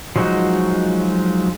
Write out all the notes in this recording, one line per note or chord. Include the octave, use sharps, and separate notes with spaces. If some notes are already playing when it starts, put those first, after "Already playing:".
F3 F#3 G#3 D#4 F#4